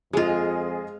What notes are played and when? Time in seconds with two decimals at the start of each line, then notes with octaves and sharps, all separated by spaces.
0.13 F2 G#3 F4 G#4 D#5